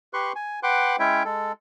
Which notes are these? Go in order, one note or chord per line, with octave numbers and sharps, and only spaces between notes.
G4 B4 C6 C#6 F#6
G#5
B4 F#5 G5 C6 D6 F#6
G#3 C#4 E4 C#5 E5 G5
G#3 A4